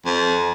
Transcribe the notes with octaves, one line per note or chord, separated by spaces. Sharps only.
F2